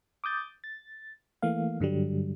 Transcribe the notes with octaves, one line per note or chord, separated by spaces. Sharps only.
D6 D#6 G6 A6
A6
E3 A3 A#3 F5
G2 D3 F#3 G3